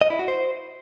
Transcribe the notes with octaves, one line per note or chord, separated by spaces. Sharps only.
D#5
E4
F#4
C5